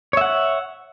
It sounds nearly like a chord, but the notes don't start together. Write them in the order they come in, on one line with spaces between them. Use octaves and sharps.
C#5 E5 F#5